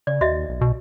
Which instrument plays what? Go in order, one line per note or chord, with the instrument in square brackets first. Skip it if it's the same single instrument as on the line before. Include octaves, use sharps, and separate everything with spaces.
[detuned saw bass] C#3 [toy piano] D5
[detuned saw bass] D#2 [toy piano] F#4 D#5 E5
[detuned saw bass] B1
[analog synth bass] B2